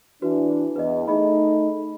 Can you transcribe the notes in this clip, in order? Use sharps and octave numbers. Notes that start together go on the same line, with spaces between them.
E3 D4 F#4 B4
E2 B4 D#5
A3 D#4 G#4 D#5 B5